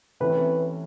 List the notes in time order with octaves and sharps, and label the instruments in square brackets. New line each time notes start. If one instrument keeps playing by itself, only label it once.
[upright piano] C3 E3 A3 C#4 [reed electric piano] B4